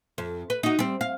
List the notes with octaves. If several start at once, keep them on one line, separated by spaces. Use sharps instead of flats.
F2
B4
D#4 F#4
G3 C4
F5